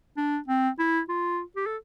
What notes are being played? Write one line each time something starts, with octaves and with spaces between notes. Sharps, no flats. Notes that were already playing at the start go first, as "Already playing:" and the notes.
D4
C4
E4
F4
G4
A4